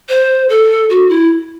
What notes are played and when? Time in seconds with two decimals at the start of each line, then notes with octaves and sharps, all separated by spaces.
0.09 C5
0.49 A4
0.90 F#4
1.09 E4